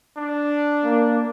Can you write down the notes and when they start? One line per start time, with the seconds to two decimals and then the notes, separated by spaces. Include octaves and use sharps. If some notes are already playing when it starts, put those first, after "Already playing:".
0.17 D4
0.84 A#3